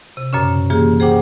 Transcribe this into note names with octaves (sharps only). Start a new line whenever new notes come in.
C3
F#2 A#2 C#3 C#4
E3 A#3 F4 G4 G#4
G#4 C5 F#5 G5 D6